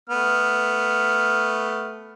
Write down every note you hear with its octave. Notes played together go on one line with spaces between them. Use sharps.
A3 B3 F6